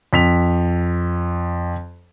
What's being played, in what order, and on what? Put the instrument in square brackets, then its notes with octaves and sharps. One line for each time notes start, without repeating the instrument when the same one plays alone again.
[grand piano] F2 B6 F7